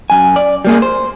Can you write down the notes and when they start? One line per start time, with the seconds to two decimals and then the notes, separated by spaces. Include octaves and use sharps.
0.10 F#2 G#5
0.36 D5
0.65 G3 A#3 G#4
0.82 C5